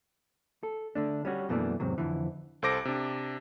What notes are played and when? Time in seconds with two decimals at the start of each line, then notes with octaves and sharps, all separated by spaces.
0.63 A4
0.95 D3 A3 D4
1.25 G3 C#4 F#4
1.49 F#2 B2 E3 A3 A#3 D4
1.80 E2 G#2 C3 F#3
1.98 F2 D3 E3
2.62 C2 A4 C5 D6 A#6 D7
2.85 C3 D4